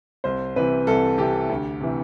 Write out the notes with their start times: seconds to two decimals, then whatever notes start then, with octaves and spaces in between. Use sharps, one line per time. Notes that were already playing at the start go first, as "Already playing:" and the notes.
0.24 C2 C5
0.56 C3 E3 B4
0.87 C2 A4
1.18 C3 E3 G4
1.50 D2
1.81 C3 E3